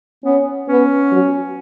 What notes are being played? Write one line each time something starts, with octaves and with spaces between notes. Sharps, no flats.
B3 C#4
B3 C#4
F#3